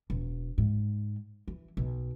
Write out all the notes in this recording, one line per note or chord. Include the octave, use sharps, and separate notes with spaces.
E1
G#2
E3
B1